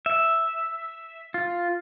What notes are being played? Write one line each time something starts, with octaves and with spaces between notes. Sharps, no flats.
E5
F4